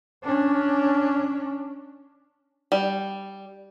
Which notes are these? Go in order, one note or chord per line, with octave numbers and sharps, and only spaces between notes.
C#4 D4
G3